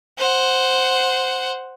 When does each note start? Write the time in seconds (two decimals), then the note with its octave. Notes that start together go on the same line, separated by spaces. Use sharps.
0.18 C5 F#5